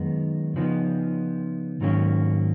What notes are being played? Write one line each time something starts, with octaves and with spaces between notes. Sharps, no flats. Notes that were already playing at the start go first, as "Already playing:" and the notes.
Already playing: F#2 D#3 G#3 B3 D#4
C#3 F3 B3 D#4
G#2 D#3 F#3 A#3 C#4